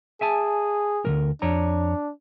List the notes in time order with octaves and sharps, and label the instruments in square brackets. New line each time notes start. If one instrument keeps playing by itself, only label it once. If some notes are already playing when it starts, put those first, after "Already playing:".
[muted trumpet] G#4 [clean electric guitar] E5 G#5 A5
[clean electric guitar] D2 F3 A#4
[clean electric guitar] F2 C#5 A#5 [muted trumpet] D4